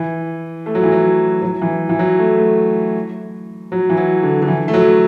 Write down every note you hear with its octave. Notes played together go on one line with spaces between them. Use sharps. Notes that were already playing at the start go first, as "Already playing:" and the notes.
Already playing: E3
A3
F#3
E3
F#3
F#3
E3
E3
F#3
A3
A3
F#3
E3
F#3
D3
D3
E3
A3
F#3